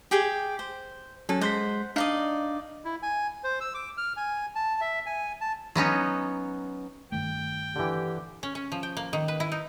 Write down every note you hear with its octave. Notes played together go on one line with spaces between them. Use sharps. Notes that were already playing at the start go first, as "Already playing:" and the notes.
G4 G#4 G5
C5
F#3 C#4 A4
G#3 C5 F#5 C6 B6
D4 D#4 D5 D#5 F5
E4
G#5
C5
E6
D6
F6
G#5
A5
E5
G#5
A5
F#3 B3 C#4 D#4
G2 D#3 A3 G5
D3 E3 G4
C#4
C#4
F3
G5
A#3
D#3
B4
E4
D#4